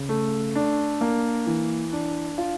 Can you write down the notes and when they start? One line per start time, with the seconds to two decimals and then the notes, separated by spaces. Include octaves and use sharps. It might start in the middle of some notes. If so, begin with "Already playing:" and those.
Already playing: C#3
0.09 A3
0.55 D4
1.01 A#3
1.46 E3
1.93 D4
2.38 F4